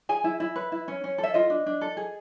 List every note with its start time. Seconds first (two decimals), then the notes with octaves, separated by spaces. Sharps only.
0.09 G#4 G#5
0.24 E4
0.40 E4
0.56 B4
0.72 E4
0.88 C#4
1.04 C#4
1.18 A4
1.23 E5
1.34 F4 D#5
1.50 D4
1.66 D4
1.81 A4
1.97 G#4